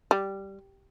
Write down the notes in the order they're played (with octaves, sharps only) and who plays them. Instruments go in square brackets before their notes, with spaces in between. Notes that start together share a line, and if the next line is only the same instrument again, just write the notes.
[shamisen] G3